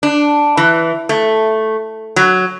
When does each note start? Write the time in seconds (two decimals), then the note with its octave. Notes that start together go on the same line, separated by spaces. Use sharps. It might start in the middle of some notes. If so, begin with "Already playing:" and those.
0.03 D4
0.57 E3
1.09 A3
2.16 F#3